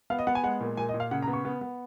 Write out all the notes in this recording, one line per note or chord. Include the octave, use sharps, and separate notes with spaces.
B3 F5
D#5
B3 F#5
G#5
G#3 F#5
A#2
A#2 G#5
D#5
A#2
F5
C#3 F#5
A#5
B3
C#6
B3
B3